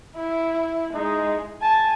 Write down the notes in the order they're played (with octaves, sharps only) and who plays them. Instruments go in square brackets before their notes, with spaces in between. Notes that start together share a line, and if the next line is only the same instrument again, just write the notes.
[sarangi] E4
[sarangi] G#3 [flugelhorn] D#4
[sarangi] G#5 [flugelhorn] A5